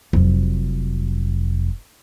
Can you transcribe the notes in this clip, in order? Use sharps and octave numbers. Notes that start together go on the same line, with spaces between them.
F1 F#3